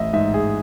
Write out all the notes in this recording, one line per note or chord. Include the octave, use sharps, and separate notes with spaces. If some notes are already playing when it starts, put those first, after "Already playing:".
Already playing: A1 D#5 E5
G#2 E5
G#4